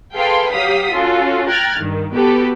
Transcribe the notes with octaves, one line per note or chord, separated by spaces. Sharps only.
G#4 A4 B4 F5 G5 C6
F#3 G4 F5 D#6 B6
C#4 F4 F#4 A4
G5 A#5 F6 F#6 G#6 A6
G2 D#3
B3 F#4 G4 A4 B4